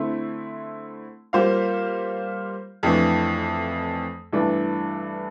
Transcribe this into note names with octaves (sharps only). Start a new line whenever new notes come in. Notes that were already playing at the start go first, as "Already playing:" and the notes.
Already playing: D3 A3 C4 E4
G3 A#3 F4 C5 F5
F2 E3 A3 D4
G2 E3 A3 D4